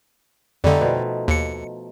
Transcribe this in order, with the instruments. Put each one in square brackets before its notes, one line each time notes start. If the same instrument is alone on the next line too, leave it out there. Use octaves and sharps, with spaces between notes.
[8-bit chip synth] F2 D3 [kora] G3 A3 D#4
[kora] B2 F3
[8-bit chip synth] D#2 C#7